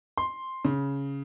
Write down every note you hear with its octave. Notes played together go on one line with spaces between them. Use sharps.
C6
C#3